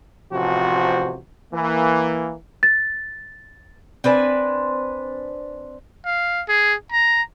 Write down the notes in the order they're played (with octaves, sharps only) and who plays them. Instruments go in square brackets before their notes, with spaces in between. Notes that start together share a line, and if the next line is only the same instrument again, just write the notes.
[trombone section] A1 C3 F3 F#4 C5
E3 A#3
[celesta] A6
[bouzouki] C4 D4 B4 G#5
[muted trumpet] F5
G#4
A#5